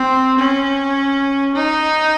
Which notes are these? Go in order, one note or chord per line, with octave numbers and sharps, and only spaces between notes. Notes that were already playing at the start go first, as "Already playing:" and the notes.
Already playing: C4
C#4
D#4